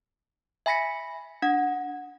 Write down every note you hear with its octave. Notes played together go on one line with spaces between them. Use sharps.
E5 G#5 B5 A#6 B6 C#7
D4 F#5